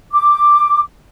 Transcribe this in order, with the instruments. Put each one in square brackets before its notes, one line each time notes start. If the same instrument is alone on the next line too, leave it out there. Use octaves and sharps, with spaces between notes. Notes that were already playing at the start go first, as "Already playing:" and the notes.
[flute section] D6